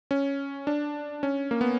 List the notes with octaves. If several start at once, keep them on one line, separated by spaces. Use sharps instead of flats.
C#4
D4
C#4
A#3
B3